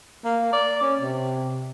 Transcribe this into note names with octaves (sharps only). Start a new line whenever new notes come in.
A#3
D5
C#4
C3